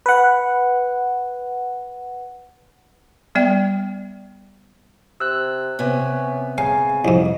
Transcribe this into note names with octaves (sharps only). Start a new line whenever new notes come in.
B4 F#5
G3 B3 D5 G5
C3 E6 F#6
C3 B3 C#4
C#3 F5 G#5
C2 F2 D#5